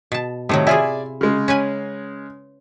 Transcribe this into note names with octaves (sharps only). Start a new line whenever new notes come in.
B2 A5
A2 C3 D#3 F#3
E4 F4 G#4 D5 E5 G#5
C#3 G#3
C#4 B4 G#5